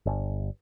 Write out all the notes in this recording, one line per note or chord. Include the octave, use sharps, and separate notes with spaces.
G1